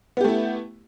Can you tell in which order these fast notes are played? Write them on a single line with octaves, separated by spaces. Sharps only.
B3 G4 A3 E4